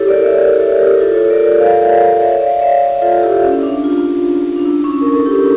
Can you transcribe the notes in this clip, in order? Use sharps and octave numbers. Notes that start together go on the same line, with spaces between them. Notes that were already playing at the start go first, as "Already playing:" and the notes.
Already playing: E4 G4 A4 C#5
A#4 D5
C#5 E5
A#4 D5
A4 C#5
G4 A#4
F4 A4
A4 C#5
A#4 D5
A#4 D5
D5 F5
C#5 E5
D5 F5
C#5 E5
D5 F5
C#5 E5
C#5 E5
F4 A4
E4 G4
C#4
D4
F4
D4
E4
C#4
A#4
A4
E4 G4